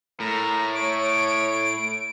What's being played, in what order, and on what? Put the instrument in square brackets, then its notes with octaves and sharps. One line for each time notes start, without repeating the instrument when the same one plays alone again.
[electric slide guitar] A2 [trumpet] A#4
[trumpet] C#5 [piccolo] D7